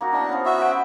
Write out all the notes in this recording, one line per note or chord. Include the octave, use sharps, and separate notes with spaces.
A#3 D#4 F#4
B3 D4 E4
F3 C#4
F#4 E5
B4 C5 G5